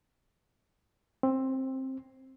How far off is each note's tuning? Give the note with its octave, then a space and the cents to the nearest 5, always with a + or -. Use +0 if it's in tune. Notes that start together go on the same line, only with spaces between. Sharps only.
C4 +15